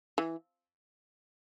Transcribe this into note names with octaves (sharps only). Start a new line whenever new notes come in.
E3